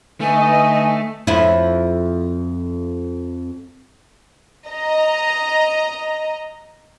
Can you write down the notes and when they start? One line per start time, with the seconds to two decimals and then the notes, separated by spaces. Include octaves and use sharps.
0.21 D3 A3 D#4 B4 D#5 G#5
1.27 F2 E4
4.68 D#5 A#5